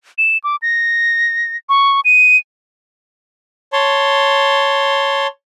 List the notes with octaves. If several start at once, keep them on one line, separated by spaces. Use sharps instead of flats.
E7
D6
A#6
C#6
D#7
C#5 A5 C6